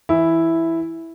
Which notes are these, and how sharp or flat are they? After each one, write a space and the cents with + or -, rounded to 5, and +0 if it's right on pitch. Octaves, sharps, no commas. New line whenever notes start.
E3 +0 E4 +0